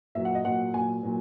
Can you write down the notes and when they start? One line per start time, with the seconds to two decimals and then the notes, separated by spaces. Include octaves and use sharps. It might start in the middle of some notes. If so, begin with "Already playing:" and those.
0.15 A#2 F#3 E5
0.25 F#5
0.35 D#5
0.45 A#2 F#3 F#5
0.73 A#2 F#3 G#5
1.03 A#2 F#3